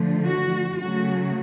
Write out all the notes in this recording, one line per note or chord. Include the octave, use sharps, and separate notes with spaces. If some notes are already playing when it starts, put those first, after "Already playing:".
Already playing: D3 F3 A3
F#4
C#3 F#3 A3 F#4